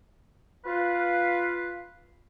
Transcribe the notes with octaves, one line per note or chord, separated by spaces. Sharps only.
F4 B4 F5